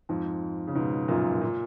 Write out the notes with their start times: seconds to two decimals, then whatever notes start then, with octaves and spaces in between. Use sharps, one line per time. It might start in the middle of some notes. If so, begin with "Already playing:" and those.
0.09 F2 G#2
0.67 C#3
0.75 G#2 B2
1.08 F#2 A#2
1.41 A#2